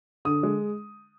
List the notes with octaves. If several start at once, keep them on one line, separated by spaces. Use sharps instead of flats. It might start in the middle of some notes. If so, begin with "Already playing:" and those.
D3 D#6
G#3